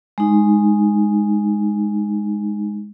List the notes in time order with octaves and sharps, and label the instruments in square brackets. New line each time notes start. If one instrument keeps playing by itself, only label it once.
[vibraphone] G#3 D#4